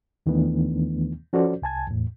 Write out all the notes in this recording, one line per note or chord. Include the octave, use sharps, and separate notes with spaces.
D#2 D#3 E3 A3 B3 D4
F3 C#4 F#4 A4 C5 D5
C2 G#5 A5 G#6
E2 A2